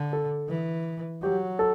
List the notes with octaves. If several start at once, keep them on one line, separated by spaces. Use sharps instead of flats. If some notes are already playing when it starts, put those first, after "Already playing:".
Already playing: D3
A4
E3
F#3 G4
A4